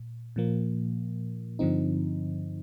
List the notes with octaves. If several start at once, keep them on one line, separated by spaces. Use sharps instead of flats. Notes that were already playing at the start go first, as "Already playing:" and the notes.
Already playing: A#2
A#2 F3 A#3
G2 D3 F3 C4 D#4